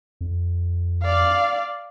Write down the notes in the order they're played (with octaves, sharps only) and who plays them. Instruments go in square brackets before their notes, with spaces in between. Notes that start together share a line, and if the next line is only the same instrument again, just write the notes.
[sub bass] F2
[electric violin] D5 F5